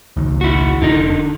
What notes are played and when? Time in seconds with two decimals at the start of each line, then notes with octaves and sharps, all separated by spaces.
0.17 C#2 D#3
0.41 E4 F#4
0.82 F1 D3 D#4
1.10 D4